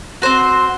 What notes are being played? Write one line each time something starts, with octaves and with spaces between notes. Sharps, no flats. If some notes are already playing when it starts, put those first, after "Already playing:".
C4 F#4 C5